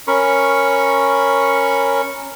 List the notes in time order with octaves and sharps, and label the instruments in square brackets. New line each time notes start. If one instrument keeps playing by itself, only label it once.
[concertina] C#4 A#4 B5 C#6